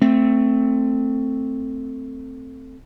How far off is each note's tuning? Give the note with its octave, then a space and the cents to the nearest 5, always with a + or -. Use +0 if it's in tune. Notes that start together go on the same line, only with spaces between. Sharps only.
A3 +15 C4 +0